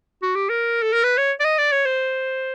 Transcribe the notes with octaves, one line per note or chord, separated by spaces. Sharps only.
F#4
G4
A#4
A4
A#4
B4
C#5
D5
D#5
D5
C#5
C5